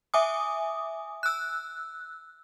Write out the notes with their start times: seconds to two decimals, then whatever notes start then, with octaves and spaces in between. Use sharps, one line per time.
0.14 E5 G#5 D6 D#6
1.23 E6 F#6